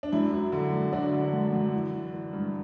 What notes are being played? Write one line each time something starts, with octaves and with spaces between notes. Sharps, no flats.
D4
F#2 E4
F#3
D3
F#2
D3 D4 F#4
D3
F#2
F#2
E3
E3
E3
G2